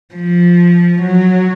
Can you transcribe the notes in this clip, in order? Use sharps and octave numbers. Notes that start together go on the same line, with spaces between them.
F3
F#3